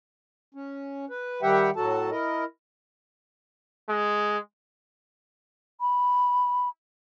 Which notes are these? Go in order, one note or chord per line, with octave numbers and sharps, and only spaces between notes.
C#4
B4
D#3 G3 G4 E5 F#5 G5
A2 F#3 F#4 A4 A5
E4 A#4 D#5
G#3
B5